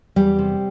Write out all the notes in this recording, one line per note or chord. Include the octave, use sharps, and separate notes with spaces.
E2 G3 G4
C3